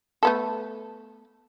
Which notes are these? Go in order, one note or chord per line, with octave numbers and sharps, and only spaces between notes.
A3 B3 A4